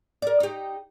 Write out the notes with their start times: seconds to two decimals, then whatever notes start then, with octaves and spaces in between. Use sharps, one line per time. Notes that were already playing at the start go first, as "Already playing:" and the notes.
0.22 A#4 D5
0.40 D#4 G4